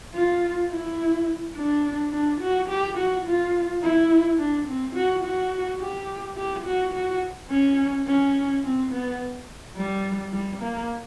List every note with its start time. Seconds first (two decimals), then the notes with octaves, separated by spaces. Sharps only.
0.14 F4
0.71 E4
1.56 D4
2.12 D4
2.41 F#4
2.69 G4
2.98 F#4
3.26 F4
3.82 E4
4.39 D4
4.67 C4
4.96 F#4
5.24 F#4
5.81 G4
6.37 G4
6.66 F#4
6.94 F#4
7.51 C#4
8.07 C#4
8.64 C4
8.92 B3
9.77 G3
10.33 G3
10.62 A#3